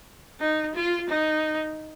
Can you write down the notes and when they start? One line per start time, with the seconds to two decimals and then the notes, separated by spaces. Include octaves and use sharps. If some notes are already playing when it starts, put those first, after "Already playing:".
0.41 D#4
0.75 F4
1.09 D#4